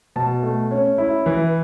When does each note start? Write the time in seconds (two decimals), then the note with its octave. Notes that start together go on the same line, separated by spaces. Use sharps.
0.16 B2 A5
0.43 A3
0.71 C#4
0.98 E4
1.26 E3